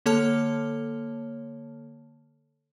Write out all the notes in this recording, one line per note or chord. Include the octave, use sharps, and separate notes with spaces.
D3 A#3 A4 C#5 A5 F6